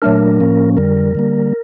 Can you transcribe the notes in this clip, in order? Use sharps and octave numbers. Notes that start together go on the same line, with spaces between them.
A#2 F#3 A3 D4 A#4
A2 F3 A#3 C#4
F2 D3 G3 A#4
D3 G3 A#3